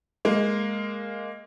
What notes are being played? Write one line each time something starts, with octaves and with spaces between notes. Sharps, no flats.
G#3 A#3